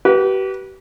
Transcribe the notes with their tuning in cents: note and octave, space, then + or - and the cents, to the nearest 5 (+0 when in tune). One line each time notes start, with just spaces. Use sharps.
G4 -40 B4 -20